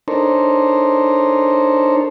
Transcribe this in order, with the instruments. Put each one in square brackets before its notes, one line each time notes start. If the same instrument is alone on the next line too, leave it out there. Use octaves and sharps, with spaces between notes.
[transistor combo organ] D4 D#4 A4 A#4 C5 C#5